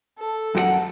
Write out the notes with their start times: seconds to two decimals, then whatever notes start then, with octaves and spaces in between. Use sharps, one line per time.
0.18 A4
0.55 F#2 G4 F#5